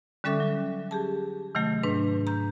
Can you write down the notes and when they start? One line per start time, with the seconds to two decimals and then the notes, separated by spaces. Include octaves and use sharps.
0.24 D3 G3 C#4 A4 E5 D6
0.40 F#3
0.91 G4 G#4 A5
1.55 C3 D#3 F#3 A3
1.83 G#2 D4 B4
2.27 A#5 G6